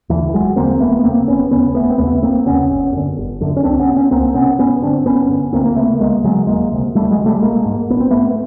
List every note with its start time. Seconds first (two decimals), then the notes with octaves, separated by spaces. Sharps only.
0.09 D#2 E3 F#3
0.14 D3
0.33 F1 F#3 G#3
0.56 D#2 D3 A#3 C4
0.80 F1 A3 B3
0.99 B3
1.03 D#2 C#3 A#3 C4
1.28 F1 B3 C#4
1.51 D#2 C#3 B3 C#4
1.75 F1 A3 B3
1.90 C4
1.98 D#2 C#3 A3 B3
2.22 F1 A#3 C4
2.46 D#2 C#3 B3 C#4
2.70 G1
2.93 F#2 D3
3.17 G1
3.40 F#2 D3
3.57 C#4
3.64 C#2 C4 D4
3.79 B3 C#4
3.88 C3
3.96 B3 C#4
4.11 C#2 A#3 C4
4.34 C3 B3 C#4
4.59 G#1 B3 C#4
4.82 G2 D3 C4 D4
5.06 G#1 B3 C#4
5.29 G2 D3
5.53 D2 A#3 C4
5.66 A#3
5.76 C#3 A3 B3
6.00 D2 G#3 A#3
6.23 C#3 F#3 G#3
6.47 E1 G#3 A#3
6.71 D2 C3
6.95 E1 G3 A3
7.10 F#3 G#3
7.18 D2
7.23 C3 G3 A3
7.42 A#1 G#3 A#3
7.65 G#2
7.90 A#1 B3
8.00 C4
8.10 G#2 A3 B3